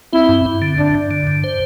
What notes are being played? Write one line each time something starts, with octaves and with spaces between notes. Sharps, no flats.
C4 E4
G2
G2
D3
G2 D4
G2
D3
G2
C5